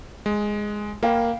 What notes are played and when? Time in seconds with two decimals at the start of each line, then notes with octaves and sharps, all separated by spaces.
0.26 G#3
1.03 A#3 F5 G5 B5